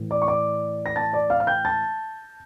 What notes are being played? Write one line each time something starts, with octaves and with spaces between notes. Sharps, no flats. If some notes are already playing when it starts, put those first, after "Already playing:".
Already playing: A2 E3
D5 D6
C#6
D5 D6
A#6
A5 A6
D5 D6
F5 F6
F6
G5 G6
A5 A6